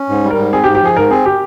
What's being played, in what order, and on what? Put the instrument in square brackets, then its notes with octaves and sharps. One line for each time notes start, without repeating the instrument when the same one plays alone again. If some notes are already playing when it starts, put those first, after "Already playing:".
Already playing: [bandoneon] C#4
G#2
G3
[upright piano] A#4
[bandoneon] G#2
[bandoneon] C4 [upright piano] G#4
[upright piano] G4
[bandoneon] G#2
[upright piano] G4
[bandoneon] F3 [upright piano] G#4
[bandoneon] G#2 [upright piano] A#4
[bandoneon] C4 [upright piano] G#4
[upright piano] G4